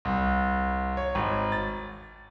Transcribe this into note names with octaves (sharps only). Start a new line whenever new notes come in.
C2
C#5
G#1
A6